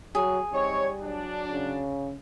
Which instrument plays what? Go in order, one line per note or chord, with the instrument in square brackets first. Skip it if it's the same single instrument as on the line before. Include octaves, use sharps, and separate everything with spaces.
[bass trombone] F#3 [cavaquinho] G#4
[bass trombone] G3 [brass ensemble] C4 D#4 C#5
[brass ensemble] F#3 D4
[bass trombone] C#3